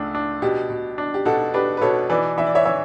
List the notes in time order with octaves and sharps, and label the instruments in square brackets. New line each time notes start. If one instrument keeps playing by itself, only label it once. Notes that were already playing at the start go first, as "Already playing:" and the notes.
Already playing: [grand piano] C#2 A3 D4
D4
[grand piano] B2 [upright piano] G4
[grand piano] B2
D4
[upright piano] G4
[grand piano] B2 [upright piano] F#4 A4
[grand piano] D4 [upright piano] G4 B4
[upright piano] B4
[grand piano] B2 [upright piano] A4 C#5
[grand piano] E3 [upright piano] B4 D5
[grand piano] E3 [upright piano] E5
[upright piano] D5
C#5 E5
[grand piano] E3 [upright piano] C#5 E5